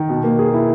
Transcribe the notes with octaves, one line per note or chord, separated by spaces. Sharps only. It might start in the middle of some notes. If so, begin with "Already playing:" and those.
Already playing: D#3
B2
A#3
G#4
E4